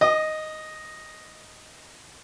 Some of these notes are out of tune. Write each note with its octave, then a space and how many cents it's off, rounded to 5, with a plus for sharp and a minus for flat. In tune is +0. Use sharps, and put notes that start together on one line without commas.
D#5 +0 D#6 -35